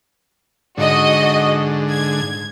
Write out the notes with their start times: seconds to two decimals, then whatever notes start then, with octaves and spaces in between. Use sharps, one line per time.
0.77 G#2 D3 F#4 D#5
1.89 G#6